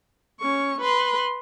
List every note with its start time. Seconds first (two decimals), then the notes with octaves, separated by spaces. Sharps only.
0.40 C#4 C#6
0.81 B4 C6